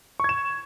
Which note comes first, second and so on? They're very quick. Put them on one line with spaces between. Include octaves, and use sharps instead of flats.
C#6 G#6 E7